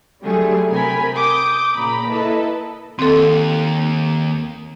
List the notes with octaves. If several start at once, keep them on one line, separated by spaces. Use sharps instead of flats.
D3 F#3 G3 A3 G#4
C3 A#4 G5 G#5 B5
D6 D#6 G6
A#2 C#3 A#5 B5
A#3 E4 A4 B4 D#5
D#2 C4 A4